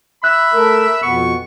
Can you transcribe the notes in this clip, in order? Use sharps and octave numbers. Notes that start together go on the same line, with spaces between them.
E5 B5 F#6
A3 A#4
F2 B2 B3 C#6